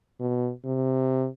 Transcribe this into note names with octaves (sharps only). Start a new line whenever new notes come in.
B2
C3